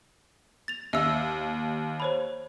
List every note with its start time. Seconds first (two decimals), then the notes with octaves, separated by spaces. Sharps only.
0.68 A6 F7
0.93 D#2 E5 E6
2.00 C5 C#5 B5